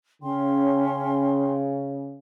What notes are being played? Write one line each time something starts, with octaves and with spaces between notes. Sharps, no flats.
C#3 C#4 G5 C6